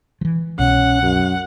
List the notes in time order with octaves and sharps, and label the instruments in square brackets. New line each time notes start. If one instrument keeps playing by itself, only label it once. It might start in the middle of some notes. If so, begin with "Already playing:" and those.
[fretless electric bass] E3 F3
[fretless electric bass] C2 B2 [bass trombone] C#4 [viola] F#5
[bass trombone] F#2